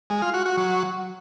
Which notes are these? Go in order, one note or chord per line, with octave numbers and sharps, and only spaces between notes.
G#3
F4
F#4
F#4
F#3